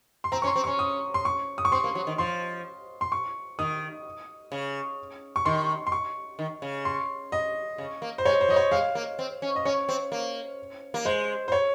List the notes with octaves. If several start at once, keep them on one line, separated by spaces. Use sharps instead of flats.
C6
C4 A#5
C#4 C#6
C6
C4
C#4 C#6
D#6
C6
C#6
D#6
C#6
C4 C6
A#3
F#3
D#3
F3 C6
C6
C#6
D#3 D#6
C#3
C#6
D#3 C6
C6
C#6
D#3
C#3
C6
D#5
C#3
A#3
C5
G#3 C#5
C5
F#3 D#5
C#5
G#3 F5
A#3
C4
C#4
D#5
C#4 C#5
C4
A#3
A#3
G#3 C5
C5
C#5